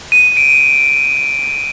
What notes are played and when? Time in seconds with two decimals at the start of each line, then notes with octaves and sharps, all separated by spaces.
0.12 D#7
0.37 D7